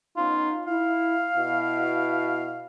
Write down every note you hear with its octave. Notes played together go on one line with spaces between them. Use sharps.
B3 C#4 D#4 F4
E4 F5
B2 E4